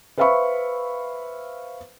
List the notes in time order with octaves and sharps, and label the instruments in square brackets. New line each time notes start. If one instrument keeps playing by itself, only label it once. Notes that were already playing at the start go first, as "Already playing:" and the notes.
[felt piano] B4 C5 E5 F5 B5 C#6